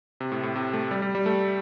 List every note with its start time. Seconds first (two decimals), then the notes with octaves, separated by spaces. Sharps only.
0.20 C3
0.32 A2
0.43 A2
0.55 C3
0.73 A3
0.91 G3
1.02 G3
1.15 G3
1.26 A3